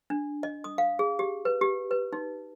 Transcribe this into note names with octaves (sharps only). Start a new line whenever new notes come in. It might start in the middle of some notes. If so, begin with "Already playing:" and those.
D4
D#5
D#6
F5
G#4
G4
B4
G4
B4
D#4